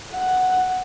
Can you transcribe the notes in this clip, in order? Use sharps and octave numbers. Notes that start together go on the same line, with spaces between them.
F#5